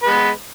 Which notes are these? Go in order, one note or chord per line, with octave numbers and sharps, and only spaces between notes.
G#3 B3 B4